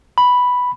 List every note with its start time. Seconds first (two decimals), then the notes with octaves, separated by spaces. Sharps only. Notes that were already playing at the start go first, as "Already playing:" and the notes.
0.18 B5